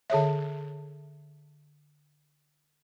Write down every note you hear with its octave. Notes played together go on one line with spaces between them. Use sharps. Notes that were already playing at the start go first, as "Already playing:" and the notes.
D3 G#4 C#5 E5